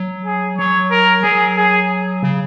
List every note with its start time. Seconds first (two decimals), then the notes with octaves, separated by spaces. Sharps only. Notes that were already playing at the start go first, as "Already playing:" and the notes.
Already playing: F#3
0.25 G#4
0.58 F#3 C#5
0.91 A#4
1.23 F#3 G#4
1.57 G#4
2.23 C#3